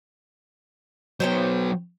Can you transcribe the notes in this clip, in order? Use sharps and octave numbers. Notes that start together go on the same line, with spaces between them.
F#3 B3 C5 C#5 G5